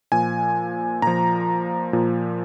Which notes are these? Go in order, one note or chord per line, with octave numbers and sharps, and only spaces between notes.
A#2 F3 G#5
A#2 F3 A#5
A#2 F3